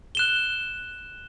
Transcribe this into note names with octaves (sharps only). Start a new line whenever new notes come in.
F#6 E7 G7